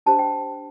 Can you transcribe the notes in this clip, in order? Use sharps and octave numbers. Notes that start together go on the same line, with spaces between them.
D4 G4 C5 A5
G5